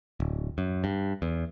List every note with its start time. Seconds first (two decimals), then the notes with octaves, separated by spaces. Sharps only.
0.20 D1
0.58 F#2
0.84 G2
1.22 E2